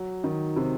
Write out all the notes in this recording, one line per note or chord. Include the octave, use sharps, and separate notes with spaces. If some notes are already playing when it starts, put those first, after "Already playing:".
Already playing: F#3
D#3
C3